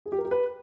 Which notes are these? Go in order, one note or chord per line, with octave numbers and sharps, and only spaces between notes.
G#4
G4
A#4
G4
B4